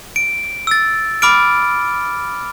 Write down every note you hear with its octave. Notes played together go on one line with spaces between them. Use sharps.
D7
E6 A6
B5 D6 F6 D7